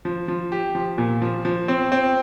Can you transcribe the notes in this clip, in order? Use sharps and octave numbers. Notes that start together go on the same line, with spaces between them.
F3
F3
G4
F3
A#2
F3
F3
C4
C4